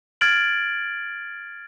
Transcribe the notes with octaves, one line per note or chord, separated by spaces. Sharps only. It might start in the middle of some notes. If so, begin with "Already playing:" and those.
F6 G#6 A6 D7 F#7